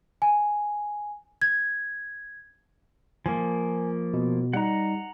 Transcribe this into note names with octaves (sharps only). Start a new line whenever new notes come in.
G#5
G#6
F3 A#3 G#5
B2
G3 D#4 F#5 A#5